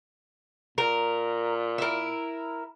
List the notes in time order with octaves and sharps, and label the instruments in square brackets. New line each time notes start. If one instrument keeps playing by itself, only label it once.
[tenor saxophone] A#2 [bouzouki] A#4
[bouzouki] E4 A#4